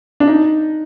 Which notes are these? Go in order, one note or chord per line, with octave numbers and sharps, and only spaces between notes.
D4
D#4